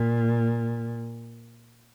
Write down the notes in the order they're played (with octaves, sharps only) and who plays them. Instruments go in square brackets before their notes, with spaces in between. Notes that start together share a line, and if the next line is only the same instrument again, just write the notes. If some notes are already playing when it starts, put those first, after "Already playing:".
Already playing: [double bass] A#2